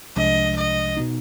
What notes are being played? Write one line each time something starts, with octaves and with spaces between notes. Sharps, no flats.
C2 C3 F3 G#3 D4 D#5
D#5
B2 B3 D#4